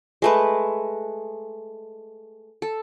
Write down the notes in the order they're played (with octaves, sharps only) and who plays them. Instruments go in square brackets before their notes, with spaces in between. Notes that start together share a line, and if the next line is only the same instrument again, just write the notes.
[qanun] G#3 A3 B4
A4